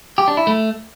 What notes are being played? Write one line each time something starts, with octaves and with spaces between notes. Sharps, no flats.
G4
D4
E4
A3